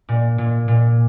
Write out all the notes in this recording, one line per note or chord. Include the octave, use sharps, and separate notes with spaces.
A#2
A#2
A#2